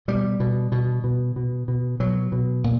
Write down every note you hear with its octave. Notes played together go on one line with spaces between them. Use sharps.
B2 G3
B2
B2
B2
B2
B2
B2 F#3
B2
A#2